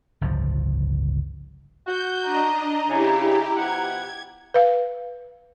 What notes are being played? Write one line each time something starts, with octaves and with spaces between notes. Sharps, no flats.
G1 C#2 A2 F3
F#4 G6
D4 D#5 A#5
C#3 E4 G4
B2 F3 F#5 G#6
B4 F5